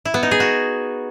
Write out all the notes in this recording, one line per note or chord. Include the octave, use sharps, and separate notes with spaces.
E4
B3
D#4
G#4
F#4